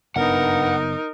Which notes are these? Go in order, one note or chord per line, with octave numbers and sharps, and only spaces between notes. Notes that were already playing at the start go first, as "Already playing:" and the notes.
F#1 G2 B3 D#4 A#4 F#5